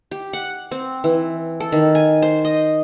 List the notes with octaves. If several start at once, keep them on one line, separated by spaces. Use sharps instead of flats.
G4
F#5
C4
E3
A4
D#3
G#5
C5
D#5